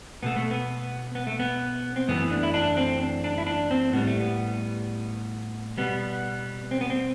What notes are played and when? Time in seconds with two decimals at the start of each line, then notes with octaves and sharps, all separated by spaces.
0.23 B2 A3 B3
0.36 A3
0.51 B3
1.15 B3
1.27 A3
1.39 B3
1.96 C4
2.08 F#2 E3 A3 B3
2.31 D4
2.43 E4
2.54 D4
2.77 C4
3.01 D4
3.24 D4
3.38 E4
3.47 D4
3.71 C4
3.93 A2 G3 B3
4.07 A3
4.20 B3
5.78 B2 G3 B3
6.71 C4
6.81 B3
6.90 C4